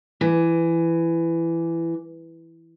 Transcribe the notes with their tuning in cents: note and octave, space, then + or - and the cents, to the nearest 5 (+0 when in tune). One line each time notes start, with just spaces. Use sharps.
E3 +15